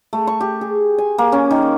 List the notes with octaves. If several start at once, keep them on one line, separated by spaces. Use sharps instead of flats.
A3
C#6
G4
G#4
G#5
A#3
C#4
D#3